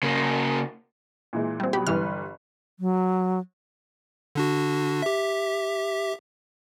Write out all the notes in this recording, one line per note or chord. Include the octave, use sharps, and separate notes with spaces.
C#3 A#3
A#2 E3 G#3
G3 C4
B2 F#3 G4 B5
G1 G2 E3 G3 B4 F6
F#3
D3 D4 F#4
G4 E5